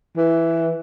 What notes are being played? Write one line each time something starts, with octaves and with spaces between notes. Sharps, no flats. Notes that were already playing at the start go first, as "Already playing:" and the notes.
E3